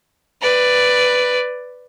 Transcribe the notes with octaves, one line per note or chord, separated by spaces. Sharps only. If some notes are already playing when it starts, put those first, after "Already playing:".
B4 D5